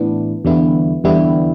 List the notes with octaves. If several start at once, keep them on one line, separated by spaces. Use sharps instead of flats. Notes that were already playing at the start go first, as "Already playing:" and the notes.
Already playing: A2 E3 B3 D4
E2 D3 G3 B3 E4
E2 D3 G3 B3 E4